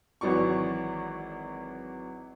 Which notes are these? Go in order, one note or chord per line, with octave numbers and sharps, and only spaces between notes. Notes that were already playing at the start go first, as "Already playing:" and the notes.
G#1 E3 F#3 D5 C#6